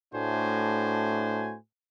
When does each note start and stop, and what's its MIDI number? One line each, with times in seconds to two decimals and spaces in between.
0.14 1.55 45
0.14 1.55 57
0.14 1.55 62
0.14 1.55 66
0.14 1.55 72
0.14 1.55 80